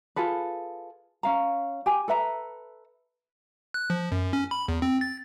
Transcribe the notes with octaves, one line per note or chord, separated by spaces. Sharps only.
F4 G#4 A4 B4
C#4 F5 A#5
G4 G#5
A4 B4 E5 A#5
F#6
F3
F#2
C#4
B5
E2
C4
A6